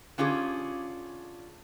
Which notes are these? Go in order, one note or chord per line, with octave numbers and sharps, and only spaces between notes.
D3 C#4 F4 G4 G#4